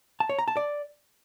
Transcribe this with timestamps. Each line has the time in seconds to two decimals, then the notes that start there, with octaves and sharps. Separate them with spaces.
0.20 A5
0.29 C#5
0.39 A#5
0.48 A5
0.57 D5